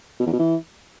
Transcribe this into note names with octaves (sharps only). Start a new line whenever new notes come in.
B2
E2
B2
E3